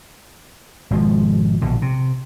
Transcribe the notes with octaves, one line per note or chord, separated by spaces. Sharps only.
G#1 B2 F3 G#3
A#1 B2 D3
C3